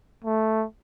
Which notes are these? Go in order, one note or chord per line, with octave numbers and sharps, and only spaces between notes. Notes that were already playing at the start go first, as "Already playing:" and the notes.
A3